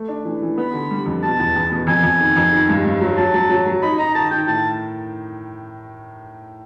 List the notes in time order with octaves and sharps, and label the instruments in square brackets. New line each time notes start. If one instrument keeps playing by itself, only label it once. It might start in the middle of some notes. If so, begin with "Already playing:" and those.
Already playing: [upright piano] A3
D4
E3
E3
[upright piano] B3 [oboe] B5
[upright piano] D3
G3
F2
[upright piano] B2 [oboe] A5
[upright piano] E2
E2
B2
[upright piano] F2 [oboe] G#5
[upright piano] F2
D#3
F2
D#3
G2
G2
F#3
[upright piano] F#3 [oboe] A5
[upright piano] F#3
F#3
F#3
[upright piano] D#4 [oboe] B5
[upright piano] D#4 [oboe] A#5
[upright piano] D#3 [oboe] A5
[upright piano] D#3 [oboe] G5
[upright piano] A2 [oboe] A5